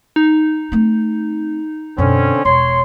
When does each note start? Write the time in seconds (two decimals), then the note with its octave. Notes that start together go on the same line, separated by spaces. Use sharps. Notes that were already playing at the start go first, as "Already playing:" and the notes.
0.16 D#4
0.72 A3 C4
1.98 F#2 B2 D3 C4 C#4
2.45 E1 C#5 C6